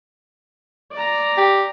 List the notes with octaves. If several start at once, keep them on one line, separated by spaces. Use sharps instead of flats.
D5 A#5
G4